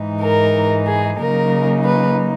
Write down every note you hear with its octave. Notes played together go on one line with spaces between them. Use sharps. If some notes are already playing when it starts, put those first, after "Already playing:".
Already playing: G#2 E3 G#3 D#4
A#4
G#4
C#3 F#3 A#3 D#4 A#4
B4